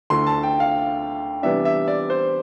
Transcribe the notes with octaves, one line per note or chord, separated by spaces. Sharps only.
D2 D3 A3 E4 C6
A5
G5
F5
C3 E3 G3 B3 D4 E5
E5
D5
C5